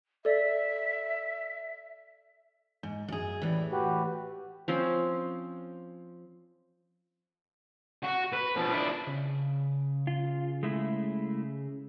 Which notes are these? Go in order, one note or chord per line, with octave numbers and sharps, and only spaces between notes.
A4 D5 E5
G#2
F#2 G#4
A2 E3 G3
F#4 G4 B4
F3 C4 C#4
F#4
B4
B2 F3
D4 E4
C#3
F4
G#3 A3 E4